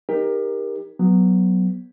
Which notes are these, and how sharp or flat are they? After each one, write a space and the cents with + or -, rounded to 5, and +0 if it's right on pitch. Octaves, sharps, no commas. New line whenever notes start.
D#4 +0 G4 +25 A#4 +10
F#3 +0 B3 +0